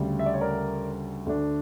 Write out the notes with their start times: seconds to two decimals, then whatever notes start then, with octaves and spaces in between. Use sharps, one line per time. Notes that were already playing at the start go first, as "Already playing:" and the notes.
Already playing: D2 C#3 G3
0.19 E5
0.26 D5
0.34 C#5
0.41 A#4 D5
1.26 D2 D3 A3 D4